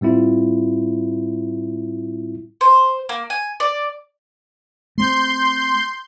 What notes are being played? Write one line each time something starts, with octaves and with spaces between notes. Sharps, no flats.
A2 G3 C4 E4 F4
C5
A#3
G#5
D5
A3 C4 C6 G6